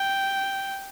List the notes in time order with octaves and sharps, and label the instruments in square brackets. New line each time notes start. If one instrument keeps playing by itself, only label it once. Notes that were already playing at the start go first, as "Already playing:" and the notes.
Already playing: [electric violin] G5